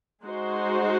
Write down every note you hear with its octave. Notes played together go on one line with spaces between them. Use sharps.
G#3 D#4 F#4 C5